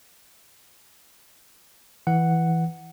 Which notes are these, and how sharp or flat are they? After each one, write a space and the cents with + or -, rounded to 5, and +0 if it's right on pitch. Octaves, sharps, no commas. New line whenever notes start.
E3 +0 F#5 +0